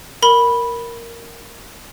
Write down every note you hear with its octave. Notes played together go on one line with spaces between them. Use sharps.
A#4 B5